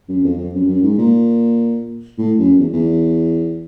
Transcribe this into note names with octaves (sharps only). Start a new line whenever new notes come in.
F#2
F2
F2
F#2
F#2
G#2
A#2
A2
F#2
E2
E2